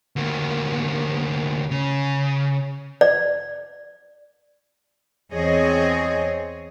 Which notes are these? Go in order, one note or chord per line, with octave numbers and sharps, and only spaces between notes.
D2 A#3
C#3
D5
E2 C4 G#4 C#5 D#5